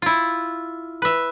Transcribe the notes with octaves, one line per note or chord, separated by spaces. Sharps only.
E4 F4
B4 E5